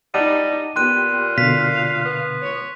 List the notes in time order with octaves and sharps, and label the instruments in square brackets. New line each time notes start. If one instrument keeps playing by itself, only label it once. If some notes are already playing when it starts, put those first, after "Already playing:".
[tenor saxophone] G3 [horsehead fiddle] D#4 [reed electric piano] D#5 F#5 A5 [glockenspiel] D#7
[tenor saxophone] A#2 [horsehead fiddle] B3 G4 [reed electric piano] G5 [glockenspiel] C6 F#6 D#7
[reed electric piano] B2 D3 [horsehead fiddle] F5 [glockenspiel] B6
[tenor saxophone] B3
[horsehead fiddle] C#5